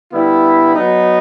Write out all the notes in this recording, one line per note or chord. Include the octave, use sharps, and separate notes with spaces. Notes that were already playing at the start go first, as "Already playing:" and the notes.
D3 G3 B3 E4
F#3 B3 D#4